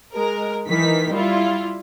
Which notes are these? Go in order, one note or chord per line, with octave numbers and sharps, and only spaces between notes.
G#3 A#4
D#3 E3 B6
G3 E4 F4